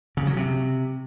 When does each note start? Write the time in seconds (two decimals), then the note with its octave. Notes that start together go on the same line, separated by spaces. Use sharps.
0.17 C#3
0.27 F#3
0.37 C3